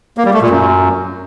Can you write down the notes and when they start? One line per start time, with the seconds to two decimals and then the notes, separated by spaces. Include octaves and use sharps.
0.18 A#3
0.26 G3
0.34 A3
0.42 A#2
0.50 F#2